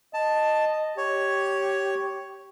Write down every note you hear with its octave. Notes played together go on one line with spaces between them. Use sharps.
D#5 A5
G4 C#5